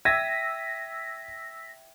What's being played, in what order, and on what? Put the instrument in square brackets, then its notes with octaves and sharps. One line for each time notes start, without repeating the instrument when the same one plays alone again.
[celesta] E5 G5 D#7 [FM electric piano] E6 A#6 B6 [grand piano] G#6